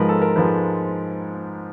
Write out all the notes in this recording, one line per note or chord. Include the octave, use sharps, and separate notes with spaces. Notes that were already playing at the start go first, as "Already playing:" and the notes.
Already playing: G#2 F3 G#3 A#4 B4
A4
A#4
G#2 F3 G#3 B4